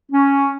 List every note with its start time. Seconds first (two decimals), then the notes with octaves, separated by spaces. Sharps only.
0.11 C#4